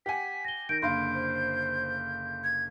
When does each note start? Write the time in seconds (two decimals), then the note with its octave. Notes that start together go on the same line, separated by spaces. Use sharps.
0.06 G4 F#5 G#5 B6
0.45 A#6 G7
0.69 D#3 G6 A#6 D7
0.82 F#1 D3 F5 B5 C6 G6 D7
1.15 C5
2.44 G#6